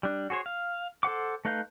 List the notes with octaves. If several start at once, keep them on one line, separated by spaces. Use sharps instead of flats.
G3 D4
F#4 G#4 C5 C#5
F5
A4 C5 F#5 D6
A3 D#4 B4 F5 G6